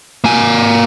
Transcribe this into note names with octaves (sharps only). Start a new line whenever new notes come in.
A#3 G#5